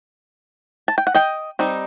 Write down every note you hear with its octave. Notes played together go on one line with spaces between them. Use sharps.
A5
G5
F#5
D#5 G5
G3 C4 D#4